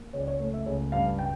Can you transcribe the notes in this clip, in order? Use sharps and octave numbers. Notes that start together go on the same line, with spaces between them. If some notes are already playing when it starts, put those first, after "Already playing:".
Already playing: A#3
C#2 C#5
D5
C#5
A3 C#5
E5
C#2 C#5
G2 F5
G5